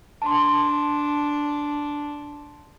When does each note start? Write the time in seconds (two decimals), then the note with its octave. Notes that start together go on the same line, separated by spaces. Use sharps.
0.22 D4 A5 C6